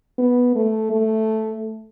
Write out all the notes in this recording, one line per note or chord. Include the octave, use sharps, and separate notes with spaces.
B3
A3
A3